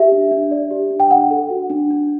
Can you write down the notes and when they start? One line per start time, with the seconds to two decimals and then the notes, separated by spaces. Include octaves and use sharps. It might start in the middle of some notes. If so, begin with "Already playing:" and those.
Already playing: G4 E5
0.12 D4
0.31 D4
0.51 D5
0.71 G4
0.90 D4
1.00 G5
1.11 D4 F#5
1.31 A4
1.50 F#4
1.70 D4
1.91 D4